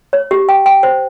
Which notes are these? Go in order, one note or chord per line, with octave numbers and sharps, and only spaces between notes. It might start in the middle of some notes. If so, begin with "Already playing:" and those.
C#5
G4
G5
G5
C5